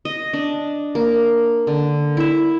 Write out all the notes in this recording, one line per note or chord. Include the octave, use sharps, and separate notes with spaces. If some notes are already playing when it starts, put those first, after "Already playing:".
D#5
D4
A#3
D3
E4 E5